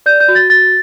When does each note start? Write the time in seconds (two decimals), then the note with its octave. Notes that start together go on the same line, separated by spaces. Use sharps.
0.06 D5 G6
0.20 G6
0.28 F#4
0.35 A6
0.50 F#4 A6